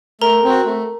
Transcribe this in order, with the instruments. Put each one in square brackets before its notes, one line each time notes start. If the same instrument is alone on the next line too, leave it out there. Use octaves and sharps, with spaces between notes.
[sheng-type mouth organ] A3 [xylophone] A#4 A#5
[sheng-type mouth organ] C4 F#4
A3